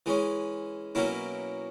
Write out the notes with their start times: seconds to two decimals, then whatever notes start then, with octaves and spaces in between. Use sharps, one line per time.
0.06 E3 G#3 C#4
0.95 B2 F#3 A#3 C#4 E4